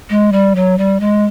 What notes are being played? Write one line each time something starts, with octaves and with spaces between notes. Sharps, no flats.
G#3
G3
F#3
G3
G#3